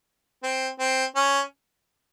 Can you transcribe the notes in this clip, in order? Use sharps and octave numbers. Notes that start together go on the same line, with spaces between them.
C4
C4
C#4